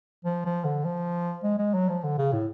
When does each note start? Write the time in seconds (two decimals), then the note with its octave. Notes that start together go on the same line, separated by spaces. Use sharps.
0.25 F3
0.46 F3
0.65 D3
0.85 F3
1.44 G#3
1.59 G#3
1.74 F#3
1.89 F3
2.04 D3
2.18 C#3
2.33 A2